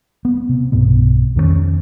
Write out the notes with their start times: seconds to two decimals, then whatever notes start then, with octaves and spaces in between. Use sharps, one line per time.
0.25 B3
0.49 C3
0.72 B1 G2 B2 B3
1.36 F2 D#3 A#3 C#4